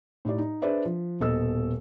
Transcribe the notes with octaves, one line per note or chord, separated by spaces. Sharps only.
A2 D#4 G4 D5
D#4
D4 G#4 B4 C5 D5 E5
F3
D#1 B2 A4 D#5 E6